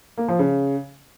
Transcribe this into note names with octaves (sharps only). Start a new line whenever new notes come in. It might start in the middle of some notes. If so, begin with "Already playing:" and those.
A#3
F3
C#3